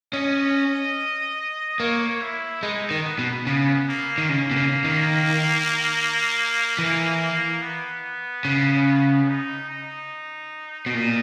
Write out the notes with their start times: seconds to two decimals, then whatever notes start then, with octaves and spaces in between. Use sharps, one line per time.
0.13 C#4 D#5
1.80 A#3 C#5
2.22 E4
2.63 G#3 D#4
2.91 D#3
3.05 B3
3.19 B2
3.46 C#3 B3
3.88 A#3
4.18 D#3
4.29 C#3 A#3
4.51 B2
4.56 C#3
4.84 D#3
6.79 E3
7.62 B3
8.45 C#3
9.28 D#4
9.69 D#4
10.86 B2
10.94 A#2